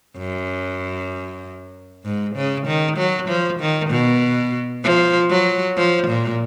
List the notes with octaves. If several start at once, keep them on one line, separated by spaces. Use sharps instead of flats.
F#2
G#2
C#3
D#3
F#3
F3
D#3
B2
F3
F#3
F3
A#2